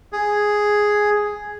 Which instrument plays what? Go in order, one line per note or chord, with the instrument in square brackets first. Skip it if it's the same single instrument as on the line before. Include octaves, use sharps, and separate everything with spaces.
[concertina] G#4